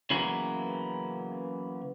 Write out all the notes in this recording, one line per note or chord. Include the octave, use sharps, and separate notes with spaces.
C#3 E3 F#3 A#3 B3 C#4